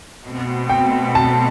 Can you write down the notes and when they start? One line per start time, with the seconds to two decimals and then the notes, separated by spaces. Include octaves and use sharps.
0.23 B2 A3 C4
0.69 G5
1.15 A5